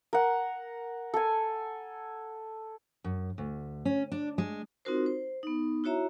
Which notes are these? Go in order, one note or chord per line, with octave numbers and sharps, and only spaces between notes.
A#4 F#5
A4 G#5
F#2
D2
C#4
D4
G#3
C4 D#4 F4 F#4 A#4 C5
C5
B3 D#4
E4 F#4 C#5 E5 A#5